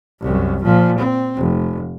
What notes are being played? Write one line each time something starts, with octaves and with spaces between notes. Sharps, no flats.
C2 F#2
A#2 F3
C4
F1